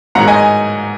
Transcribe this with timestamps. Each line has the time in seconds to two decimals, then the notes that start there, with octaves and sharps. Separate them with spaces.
0.15 G#2 D#3 F#3 D#4 F#5 A#5
0.28 D#5 G#5